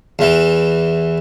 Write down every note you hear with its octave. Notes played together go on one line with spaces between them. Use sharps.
E2 E3